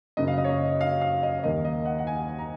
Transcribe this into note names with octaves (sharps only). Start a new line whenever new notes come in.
F#1 F#2 C#3 D#5
F5
D#5
C#5
D#5
F5
F5
D#5
D#2 D#3 A#3 D#5
D#5
F#5
F#5
G#5
A#5